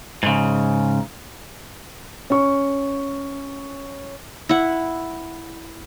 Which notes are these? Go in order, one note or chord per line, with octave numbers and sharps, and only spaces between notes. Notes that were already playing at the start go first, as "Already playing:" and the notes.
G#2 C#3
C#4 C#6
E4 F#5